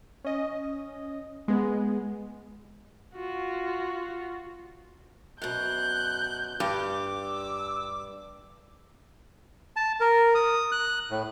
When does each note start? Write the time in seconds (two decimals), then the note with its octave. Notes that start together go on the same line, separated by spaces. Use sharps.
0.25 C#4 D#5
1.48 G#3 B3
3.15 F4 F#4
5.42 F#2 B2 F#6 G6
6.60 G2 G4 D6
7.26 E6
9.76 A5
10.00 A#4
10.35 D#6
10.72 F#6
11.10 A2